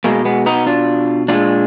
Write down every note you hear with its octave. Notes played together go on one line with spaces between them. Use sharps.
B2 G#3 A#3
G#3 B3
B3 D#4
D4 F4
A#2 G#3 D4 F4